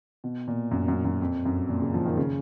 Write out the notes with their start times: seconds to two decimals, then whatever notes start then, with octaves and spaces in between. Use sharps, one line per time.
0.24 B2
0.47 A#2
0.71 F#2
0.88 F#2
1.05 F#2
1.21 F2
1.45 F#2
1.69 A#2
1.82 C#3
1.94 F3
2.05 D#3
2.17 C#3